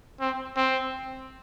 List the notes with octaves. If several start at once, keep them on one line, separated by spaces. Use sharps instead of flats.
C4
C4